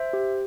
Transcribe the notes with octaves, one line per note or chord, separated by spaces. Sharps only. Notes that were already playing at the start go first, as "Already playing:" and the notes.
Already playing: C5 E5
G4